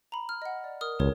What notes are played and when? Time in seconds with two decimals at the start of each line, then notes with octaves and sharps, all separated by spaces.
0.12 A#5 B5
0.29 F6
0.42 D#5 F#5
0.64 D5
0.81 A#4 D#6 F6
0.99 C#2 G4 A#4 C#5